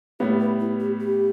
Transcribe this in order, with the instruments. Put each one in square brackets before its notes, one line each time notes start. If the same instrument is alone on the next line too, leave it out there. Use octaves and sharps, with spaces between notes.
[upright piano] A2 G3 B3 [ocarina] G4
[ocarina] B4
E4
G4
G4